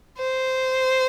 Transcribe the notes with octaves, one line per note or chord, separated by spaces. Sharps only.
C5